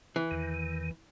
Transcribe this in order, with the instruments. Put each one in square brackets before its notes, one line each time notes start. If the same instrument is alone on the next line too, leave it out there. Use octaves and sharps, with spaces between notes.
[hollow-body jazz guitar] E3
[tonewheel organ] E2 D#3